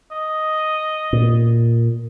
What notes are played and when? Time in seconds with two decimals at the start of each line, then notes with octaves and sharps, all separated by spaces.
0.11 D#5
1.13 A#2